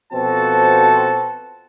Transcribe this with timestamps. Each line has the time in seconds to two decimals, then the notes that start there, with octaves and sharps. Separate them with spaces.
0.13 B2 F3 C4 F#4 A4 A5